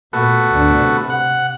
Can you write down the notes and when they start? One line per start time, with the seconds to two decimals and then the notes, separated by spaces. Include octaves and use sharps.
0.13 A#2 A3 B3 F#4
0.51 D2 D4
0.81 C3
1.10 F#5